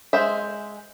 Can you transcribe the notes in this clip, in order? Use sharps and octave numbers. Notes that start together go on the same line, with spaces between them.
G#3 C5 E5